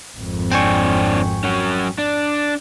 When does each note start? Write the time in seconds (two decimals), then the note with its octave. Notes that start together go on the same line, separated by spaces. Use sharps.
0.17 G#1 F2
0.52 C4 D4 G5 G#5 C#6
1.44 F#3 C#4
1.98 D4